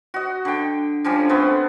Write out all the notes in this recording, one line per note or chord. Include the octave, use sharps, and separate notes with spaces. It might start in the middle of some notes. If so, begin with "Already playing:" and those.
F#4 D#5
D3 G5
D3 F3 G3 C#4
A3 B3 C4 C5